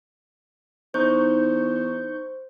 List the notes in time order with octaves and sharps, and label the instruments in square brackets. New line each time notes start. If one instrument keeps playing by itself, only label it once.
[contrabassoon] E2 [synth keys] D#4 C#6 G6 [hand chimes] C5